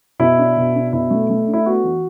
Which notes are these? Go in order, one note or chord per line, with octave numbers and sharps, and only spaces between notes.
B2 E4
D4
B2
D4
B2 E4
A3
A3
D4
E4
B3 F#4
E3